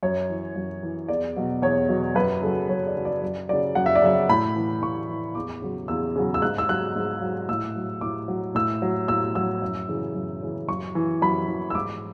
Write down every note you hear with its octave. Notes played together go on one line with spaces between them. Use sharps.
F#2 C#5
E3
F#2
E3
E2 D5
B2 F#3
E2 C#5
B2 F#3
F#2 B4
C#3 F#3 A4
F#2 C#5
D5
C#3 F#3
D5
F#2 D5
C#3 F#3 D5
F#2 F#5
E5
D5
C#3 F#3 E5
A2 B5
E3
A2 C#6
E3
E2 D6
C#3 F#3
E2 E6
C#3 F#3
E6
G#2 F#6
E6
F#3 F#6
G#2
F#3
A2 E6
F#3
A2 D6
F#3
A2 E6
F#3
A2 E6
F#3 E6
F#2
C#3 E3
F#2
C#3 E3
F#2 C#6
E3
F#2 B5
E3
E6
G#2 D6